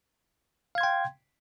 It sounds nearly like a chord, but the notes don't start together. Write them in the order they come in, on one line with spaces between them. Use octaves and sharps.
F5 G#6 C6 G5